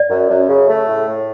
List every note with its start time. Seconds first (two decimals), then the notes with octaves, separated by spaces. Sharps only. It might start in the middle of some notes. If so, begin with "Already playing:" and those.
Already playing: D5
0.09 F#2
0.29 F#2
0.48 C#3
0.68 A3
0.88 A2
1.07 A2